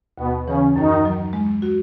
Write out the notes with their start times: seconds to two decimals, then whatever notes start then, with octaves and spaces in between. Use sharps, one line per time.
0.18 D#2 B2 B3
0.46 C#3 E3 C#4
0.75 F#2 D#3 D#4
1.05 F#3
1.33 G#3
1.62 F#4